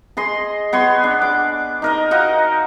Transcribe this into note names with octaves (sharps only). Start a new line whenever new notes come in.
G#4 D#5 C6
B3 C#5 C6
D4
D6
D#4 A#4 D#5
D#4 F#4 D#5 F5